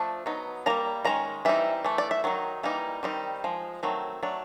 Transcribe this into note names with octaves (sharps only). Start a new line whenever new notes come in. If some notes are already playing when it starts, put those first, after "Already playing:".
Already playing: F3 A3 D4
F#3 B3 D#4
G3 A#3 D4 A#5
D#3 G#3 C#4 A#5
E3 G3 C4 D#4 E5
E3 A3
D5
E5
D#3 F#3 D#4
E3 G3 A#3 D#4
D#3 G3 C4 D#4
F3 G#3
D#3 F#3 A3 C4
F#3 A3 D4